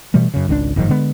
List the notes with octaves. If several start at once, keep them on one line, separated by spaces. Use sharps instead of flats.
B2 E3 G3 A3
F#2 C#3
G#1 C#2 C3 D4
F#1 G#2 D#3 F3
D3 G#3 B3